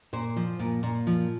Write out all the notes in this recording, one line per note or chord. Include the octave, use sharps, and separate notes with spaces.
A#2 C5
F3
A#2
A#2
F3